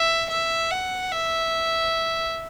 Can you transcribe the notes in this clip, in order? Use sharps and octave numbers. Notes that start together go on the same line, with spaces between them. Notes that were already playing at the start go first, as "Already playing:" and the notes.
Already playing: E5
E5
F#5
E5